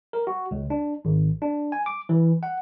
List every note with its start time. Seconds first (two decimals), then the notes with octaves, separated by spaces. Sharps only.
0.13 A#4
0.27 F#4
0.51 C#2
0.70 D4
1.05 G#1
1.42 D4
1.72 G#5
1.86 D6
2.09 E3
2.43 F#5